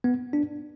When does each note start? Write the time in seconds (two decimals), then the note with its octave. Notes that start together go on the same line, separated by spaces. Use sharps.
0.04 B3
0.33 D4